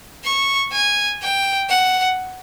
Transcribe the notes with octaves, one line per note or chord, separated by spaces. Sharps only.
C#6
G#5
G5
F#5